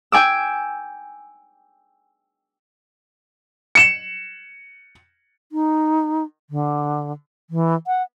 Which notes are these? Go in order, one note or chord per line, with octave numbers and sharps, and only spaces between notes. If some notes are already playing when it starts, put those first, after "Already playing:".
G5 G#5 D6 E6
C#7 E7
D#4
D3
E3
F#5